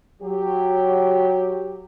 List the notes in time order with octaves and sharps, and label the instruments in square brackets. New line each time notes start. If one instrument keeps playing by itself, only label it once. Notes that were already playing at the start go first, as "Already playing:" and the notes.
[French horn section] F#3 G4